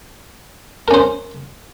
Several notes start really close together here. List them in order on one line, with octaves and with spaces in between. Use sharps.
A#4 C#4 C5